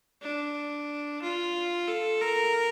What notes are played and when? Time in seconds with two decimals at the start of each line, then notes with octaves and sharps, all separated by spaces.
0.22 D4
1.22 F4
1.87 A4
2.21 A#4